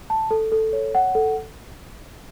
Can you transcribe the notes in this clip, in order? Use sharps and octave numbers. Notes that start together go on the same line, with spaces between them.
A5
A4
A4
C#5
F#5
A4